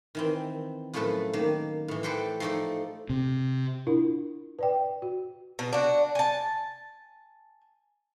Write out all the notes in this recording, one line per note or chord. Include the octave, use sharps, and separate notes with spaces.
D#3 E3 C4
F#2 A2 F3 A3 A4 B4
D#3 A#3
A2 E3
G4 A4 B4 C5 F#5 G5
F3 A3 D#4 A4 D5
C3
D4 E4 F4 A#4
B4 D5 G5
F#4
B2
D4 F#4
G#5 A5